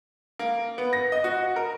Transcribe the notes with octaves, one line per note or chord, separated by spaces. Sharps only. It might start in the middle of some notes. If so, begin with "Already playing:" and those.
A#3
B3
A#6
D#5
F#4
A#4